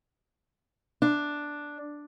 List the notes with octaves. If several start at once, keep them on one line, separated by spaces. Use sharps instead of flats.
D4